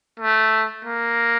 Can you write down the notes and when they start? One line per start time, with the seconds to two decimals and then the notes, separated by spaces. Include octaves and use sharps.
0.19 A3
0.85 A#3